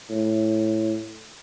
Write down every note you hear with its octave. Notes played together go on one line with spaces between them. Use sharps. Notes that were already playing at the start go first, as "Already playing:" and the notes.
A2